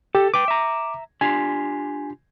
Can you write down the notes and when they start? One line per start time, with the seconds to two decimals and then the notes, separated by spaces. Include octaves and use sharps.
0.15 G4 A4
0.34 B4 G5 D6
0.48 E5 A#5
1.21 D4 F4 G4 G#5